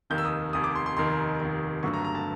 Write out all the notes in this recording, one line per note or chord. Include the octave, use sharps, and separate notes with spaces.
F1 D#2 D#3 G6
E6
D#6
F1 D#2 D#3 D#6
D6
C6
C6
F1 D#2 D#3 C6
F1 D#2 D#3
G1 G2 D3 F#3 A3 C#6
A#5
A#5
A5